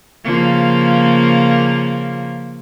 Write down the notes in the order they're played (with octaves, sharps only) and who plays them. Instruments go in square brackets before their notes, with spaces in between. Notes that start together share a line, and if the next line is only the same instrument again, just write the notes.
[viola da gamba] C#3 F3 A#3